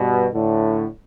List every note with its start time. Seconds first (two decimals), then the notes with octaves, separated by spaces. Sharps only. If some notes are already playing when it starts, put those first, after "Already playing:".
Already playing: G2 B2
0.33 A2 D3